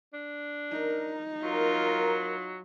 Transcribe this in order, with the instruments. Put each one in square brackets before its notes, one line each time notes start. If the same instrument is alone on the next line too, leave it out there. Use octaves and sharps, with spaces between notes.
[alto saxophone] D4
[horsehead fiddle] D#4 [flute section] A#4
[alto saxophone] F#3 [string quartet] F4 [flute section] A#4